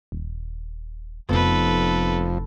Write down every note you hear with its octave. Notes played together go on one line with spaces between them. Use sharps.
D#1
F1 F2 B3 D#4 A4 B4